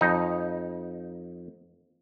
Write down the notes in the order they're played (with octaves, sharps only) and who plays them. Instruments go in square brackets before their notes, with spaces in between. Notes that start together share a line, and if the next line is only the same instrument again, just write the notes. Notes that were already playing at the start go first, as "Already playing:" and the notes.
[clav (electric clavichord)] F2 D#4